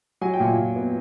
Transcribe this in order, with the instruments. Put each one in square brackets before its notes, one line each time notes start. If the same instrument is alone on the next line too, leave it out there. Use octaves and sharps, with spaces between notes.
[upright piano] F#3 G#5
G5
A#2 G#5
A#2
B3